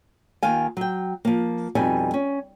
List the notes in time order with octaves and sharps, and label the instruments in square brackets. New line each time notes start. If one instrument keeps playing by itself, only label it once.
[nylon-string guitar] D#2 D#3 F4 F5 G#5
F#3 G5
F3 A#3
F2 B2 G3 D#4 G#5
C#4